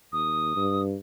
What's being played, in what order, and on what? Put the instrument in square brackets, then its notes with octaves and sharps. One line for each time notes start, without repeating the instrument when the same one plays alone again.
[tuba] D#2 [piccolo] D#6
[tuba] G2